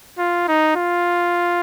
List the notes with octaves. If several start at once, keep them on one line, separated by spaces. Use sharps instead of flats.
F4
D#4
F4